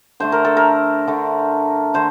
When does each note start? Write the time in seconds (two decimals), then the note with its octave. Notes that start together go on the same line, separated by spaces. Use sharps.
0.20 D3 A3 D4 C5
0.32 A#4
0.45 A4
0.57 A#4
1.07 D3 A3 D4
1.94 D3 A3 C5